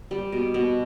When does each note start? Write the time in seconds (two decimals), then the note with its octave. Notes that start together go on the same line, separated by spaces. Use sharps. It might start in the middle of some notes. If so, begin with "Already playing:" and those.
0.11 G3
0.32 B2
0.54 B2